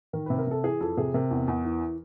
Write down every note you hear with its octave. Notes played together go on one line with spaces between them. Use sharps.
D#3 A#4
C3 B4
A#4
C3 A4
E3 G#4
F2 A4
C3 G#4
C3 A#4
E2
E2
E3